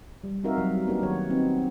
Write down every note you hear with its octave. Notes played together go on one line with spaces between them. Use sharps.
G3
C4 D#4 F#4 A#4 E5 F5
F#3 G3
A#3 B3 D4 D#4 G4 A#4
D#3 F#3 F#4 C#5
B3 C4 D#4